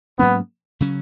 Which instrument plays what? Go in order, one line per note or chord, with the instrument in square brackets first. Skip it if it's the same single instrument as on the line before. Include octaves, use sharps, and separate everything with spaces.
[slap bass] G#2 F#3 A#3 C#4 [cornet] B3
[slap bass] C#3 F#3 C#4